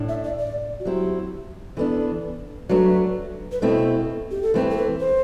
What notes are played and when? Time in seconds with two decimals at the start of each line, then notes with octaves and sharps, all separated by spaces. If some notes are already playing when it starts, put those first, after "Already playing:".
Already playing: A2 D4
0.08 E5
0.24 D5
0.38 D5
0.80 F#4
0.84 F#3 C4 E4 G4
1.77 E3 B3 D4 A4
2.69 F#3 A3 D4 B4
3.52 B4
3.62 B2 A3 C4 E4 A4
4.31 G4
4.43 A4
4.54 E3 A3 C4 E4 B4
4.70 A4
4.77 B4
5.00 C5